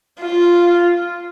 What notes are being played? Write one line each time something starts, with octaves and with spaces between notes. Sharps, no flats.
F4